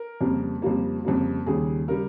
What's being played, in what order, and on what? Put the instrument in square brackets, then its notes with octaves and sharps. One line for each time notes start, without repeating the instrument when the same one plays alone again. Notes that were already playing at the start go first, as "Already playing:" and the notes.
Already playing: [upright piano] A#4
F2 C#3 G3 A#3
F2 C#3 G3 A#3 F4
F2 C#3 G3 A#3
D#2 C#3 G3 G#4
C#3 G3 A#4